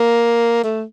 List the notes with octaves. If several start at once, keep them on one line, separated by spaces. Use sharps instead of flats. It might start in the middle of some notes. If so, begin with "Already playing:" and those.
Already playing: A#3
A3